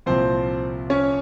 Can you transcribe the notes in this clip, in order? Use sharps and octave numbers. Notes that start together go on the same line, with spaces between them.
C2 A#2 F3 C4 C5
C#4 C#5